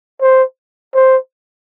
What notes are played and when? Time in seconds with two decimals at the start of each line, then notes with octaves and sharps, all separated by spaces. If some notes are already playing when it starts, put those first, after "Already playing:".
0.21 C5
0.95 C5